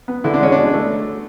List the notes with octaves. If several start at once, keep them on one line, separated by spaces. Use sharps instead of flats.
B3
D3 E4
D4
G#3 C#4
B2 D4
A3